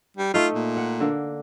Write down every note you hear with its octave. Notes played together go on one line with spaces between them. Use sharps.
G3
A3 D#4 F4
A#2
F#5
D3 A#3